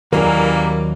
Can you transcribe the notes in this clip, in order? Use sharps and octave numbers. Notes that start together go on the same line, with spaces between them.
D#2 E3 F#3 G3 A#3 C#4 A#4